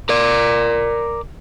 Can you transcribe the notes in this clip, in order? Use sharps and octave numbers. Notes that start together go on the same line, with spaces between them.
A#4 D5